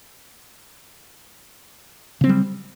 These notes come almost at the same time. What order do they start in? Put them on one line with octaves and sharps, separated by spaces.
C#3 C4 F#3 G3